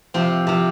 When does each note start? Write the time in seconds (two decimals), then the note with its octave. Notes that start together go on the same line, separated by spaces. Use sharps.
0.14 C3 F3 C4
0.47 C3 F3